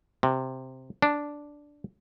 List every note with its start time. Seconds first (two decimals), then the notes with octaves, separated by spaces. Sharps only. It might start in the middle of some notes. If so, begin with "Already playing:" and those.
0.23 C3
1.02 D4